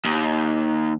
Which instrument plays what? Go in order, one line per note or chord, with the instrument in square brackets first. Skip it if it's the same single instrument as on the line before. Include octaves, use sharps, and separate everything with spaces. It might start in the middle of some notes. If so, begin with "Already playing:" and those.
[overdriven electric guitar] D#2